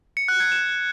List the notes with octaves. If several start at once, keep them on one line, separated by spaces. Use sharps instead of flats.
C#7
F#6
G#6
E7